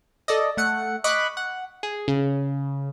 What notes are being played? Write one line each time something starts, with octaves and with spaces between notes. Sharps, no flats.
A4 D5 D#5
A3 F#5 C#7
D#5 B5 C#6 D6 F#6
F#5
G#4
C#3